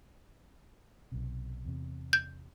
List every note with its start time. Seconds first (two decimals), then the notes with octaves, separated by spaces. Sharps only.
1.12 B1 C3
1.65 E2 C3
2.13 G6